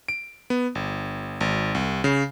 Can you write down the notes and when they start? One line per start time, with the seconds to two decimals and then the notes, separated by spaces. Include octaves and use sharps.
0.08 D7
0.50 B3
0.75 G1
1.41 G#1
1.75 C2
2.04 C#3